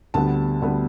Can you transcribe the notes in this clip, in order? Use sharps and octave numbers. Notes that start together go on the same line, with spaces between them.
D2 D3 G3 B3 A5
D2 D3 G3 B3